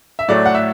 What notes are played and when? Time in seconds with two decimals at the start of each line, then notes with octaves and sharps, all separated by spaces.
0.19 E5
0.28 A2 F#3 A3 D5
0.46 F#5
0.55 E5